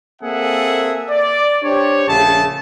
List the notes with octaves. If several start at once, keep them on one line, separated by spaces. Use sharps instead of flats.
A#3 C4 G#4 A4 E5 F#5
D5
D4 G4 C5 C#5
A#1 C#3 A3 G#4 A5